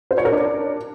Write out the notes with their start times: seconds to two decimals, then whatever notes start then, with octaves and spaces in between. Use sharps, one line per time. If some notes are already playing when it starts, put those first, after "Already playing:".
0.11 C5
0.18 C#5
0.25 A#4
0.32 D4